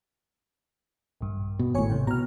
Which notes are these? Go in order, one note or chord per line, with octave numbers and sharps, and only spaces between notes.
A#1 G2
B2
G#1 A2 C#5 G#5 C#6
G1 C3 G5
B2 A#5 F6